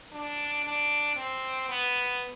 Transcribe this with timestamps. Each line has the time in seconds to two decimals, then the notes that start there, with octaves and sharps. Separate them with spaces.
0.12 D4
0.64 D4
1.16 C4
1.69 B3